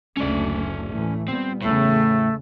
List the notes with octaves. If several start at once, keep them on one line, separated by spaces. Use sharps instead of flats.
F#1 D2 A3 C#4 D5
A2 E3 A3
A#2 G3 B3 C4
E2 A2 C#3 A3